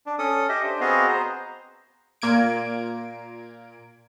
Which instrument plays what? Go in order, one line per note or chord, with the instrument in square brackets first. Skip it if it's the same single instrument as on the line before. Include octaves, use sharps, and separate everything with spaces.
[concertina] D4
C#4 A4 D#6
G4 D#5 E5
D4 C5
B3 C4 F#4 G#4 D#5 F5
C5 A#5
[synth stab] A#2 A#3 G#6 D7